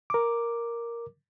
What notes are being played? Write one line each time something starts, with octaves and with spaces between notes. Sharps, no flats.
A#4 D6